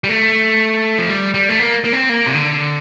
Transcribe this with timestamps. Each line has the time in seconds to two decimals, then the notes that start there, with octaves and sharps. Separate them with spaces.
0.04 G3
0.09 A3
0.98 F3
1.09 G3
1.34 G3
1.49 A3
1.59 A#3
1.84 A#3
1.93 C4
2.09 A#3
2.26 C3
2.34 D3